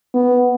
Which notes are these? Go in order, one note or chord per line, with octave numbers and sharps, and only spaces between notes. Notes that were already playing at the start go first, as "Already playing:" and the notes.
B3